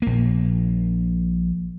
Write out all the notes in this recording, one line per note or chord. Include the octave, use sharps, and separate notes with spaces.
A#1 A#3